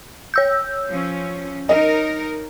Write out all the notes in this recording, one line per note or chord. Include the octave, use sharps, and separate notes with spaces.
C#5 E6 G6
F3 C#4
D#4 A#4 D#5